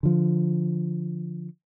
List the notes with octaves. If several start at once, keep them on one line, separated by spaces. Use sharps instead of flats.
D3 F3